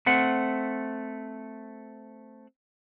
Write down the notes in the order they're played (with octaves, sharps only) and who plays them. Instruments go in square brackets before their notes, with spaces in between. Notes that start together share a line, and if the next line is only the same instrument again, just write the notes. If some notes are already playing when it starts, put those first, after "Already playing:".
[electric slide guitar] A3 C4 F#5